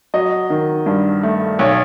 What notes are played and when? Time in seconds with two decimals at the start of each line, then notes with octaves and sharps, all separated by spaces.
0.14 F#3 D#5
0.50 D#3
0.86 G2
1.23 A3
1.59 B1 C#5